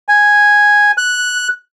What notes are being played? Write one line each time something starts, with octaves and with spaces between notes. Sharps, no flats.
G#5
F#6